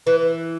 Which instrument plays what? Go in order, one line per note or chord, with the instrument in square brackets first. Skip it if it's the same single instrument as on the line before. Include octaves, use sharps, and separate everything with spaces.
[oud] E3 [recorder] B4